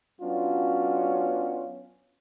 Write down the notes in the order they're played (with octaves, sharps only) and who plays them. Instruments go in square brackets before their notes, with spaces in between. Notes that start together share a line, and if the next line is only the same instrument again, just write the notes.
[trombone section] F#3 B3 C#4 D4 F4 F#4